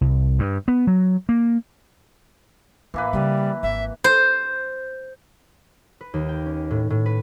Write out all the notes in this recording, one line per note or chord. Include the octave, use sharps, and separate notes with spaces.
C2
G2
B3
F#3
A#3
A1 E3 A#3 B4
C#3 G3
G#1 E5
C5
B4
D#2
G5
C#4
A2
A2
B4